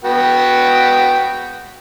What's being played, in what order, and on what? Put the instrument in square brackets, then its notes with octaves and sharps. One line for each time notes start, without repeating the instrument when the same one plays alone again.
[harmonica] B3 F#4 G5